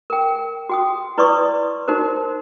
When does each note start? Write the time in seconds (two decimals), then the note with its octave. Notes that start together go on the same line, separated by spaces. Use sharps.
0.10 A#4 G5
0.69 F#4 G5 D#6
1.18 E4 B4 D5 C6 C#6 D#6
1.88 D#4 F#4 A#4 C5